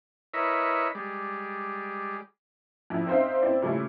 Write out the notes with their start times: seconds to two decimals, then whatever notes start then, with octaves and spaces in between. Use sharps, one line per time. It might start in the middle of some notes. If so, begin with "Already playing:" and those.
0.34 E4 A#4 B4 C#5 D#5 E5
0.95 G3 G#3 D5
2.90 F2 E4
3.07 C4 D#4 C5 E5 F5
3.42 C4 E4 D5
3.62 A#2 C#3 G3 A3 E4